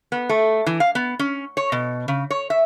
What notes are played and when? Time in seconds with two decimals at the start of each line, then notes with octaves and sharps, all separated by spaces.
0.12 B3
0.29 A3
0.66 E3
0.80 F5
0.95 B3
1.19 C#4
1.57 C#5
1.72 B2
2.08 C#3
2.30 C#5
2.50 E5